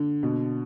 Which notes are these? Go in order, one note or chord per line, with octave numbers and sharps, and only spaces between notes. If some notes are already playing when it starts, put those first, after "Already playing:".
Already playing: D3
B2